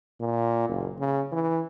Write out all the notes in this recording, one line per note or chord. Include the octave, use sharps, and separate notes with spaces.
A#2
F#1
C#3
E3